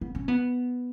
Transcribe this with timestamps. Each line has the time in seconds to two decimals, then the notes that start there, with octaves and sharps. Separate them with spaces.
0.01 B3
0.15 C#4
0.28 B3